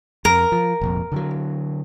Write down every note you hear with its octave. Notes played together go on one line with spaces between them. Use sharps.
F2 A#4
F3
F1 A#1 F2
D3 D#3 F#3